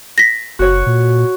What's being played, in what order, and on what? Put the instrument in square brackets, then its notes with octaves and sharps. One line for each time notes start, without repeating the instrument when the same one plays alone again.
[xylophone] A#6 B6
[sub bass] F#1 [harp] F#4 C#5
[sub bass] A#2